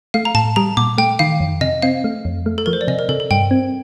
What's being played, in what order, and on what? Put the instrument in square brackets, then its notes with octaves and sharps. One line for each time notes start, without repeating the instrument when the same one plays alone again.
[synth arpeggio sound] A3 [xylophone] F5
[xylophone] A#5
[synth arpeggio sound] A2 [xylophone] A5
[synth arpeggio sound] G3 [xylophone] A#5
[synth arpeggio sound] A#2 [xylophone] D6
[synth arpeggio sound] A3 [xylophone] G5
[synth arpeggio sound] D#3 [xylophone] F5
[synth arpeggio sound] F2
[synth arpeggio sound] C3 [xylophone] D#5
[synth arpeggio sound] C4 [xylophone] F5
[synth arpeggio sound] A3
F2
A3
[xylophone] A4
[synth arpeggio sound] F3 [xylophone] A#4
[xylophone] C5
D5
[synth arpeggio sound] C3 [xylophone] D#5
[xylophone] A#4
[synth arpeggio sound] C3 [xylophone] A4
[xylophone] A4
[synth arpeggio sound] G2 [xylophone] G5
[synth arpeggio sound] C4